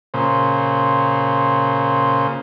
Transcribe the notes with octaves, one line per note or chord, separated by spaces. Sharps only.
A#2 C#3 C5